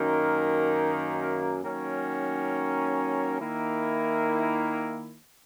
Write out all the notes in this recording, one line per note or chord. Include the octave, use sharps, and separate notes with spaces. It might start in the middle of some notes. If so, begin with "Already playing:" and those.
Already playing: F#2 D#3 A#3
D#3 F#3 A#3 C#4
D#3 A#3 E4